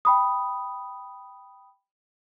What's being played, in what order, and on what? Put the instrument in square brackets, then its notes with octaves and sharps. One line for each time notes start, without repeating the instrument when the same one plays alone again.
[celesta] G5 B5 D#6